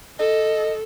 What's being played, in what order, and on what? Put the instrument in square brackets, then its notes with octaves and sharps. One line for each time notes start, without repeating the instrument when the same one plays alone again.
[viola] A4 [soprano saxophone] D#5